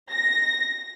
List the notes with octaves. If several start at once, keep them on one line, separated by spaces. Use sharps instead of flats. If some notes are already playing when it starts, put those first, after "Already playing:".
A#6